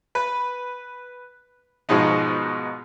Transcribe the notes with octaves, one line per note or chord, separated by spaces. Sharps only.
B4
G#2 B2 F3 G#3 B3 D#4